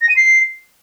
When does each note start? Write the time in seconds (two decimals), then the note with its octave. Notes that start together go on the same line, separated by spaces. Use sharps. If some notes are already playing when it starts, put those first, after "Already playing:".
0.02 A#6
0.09 D#7
0.16 C7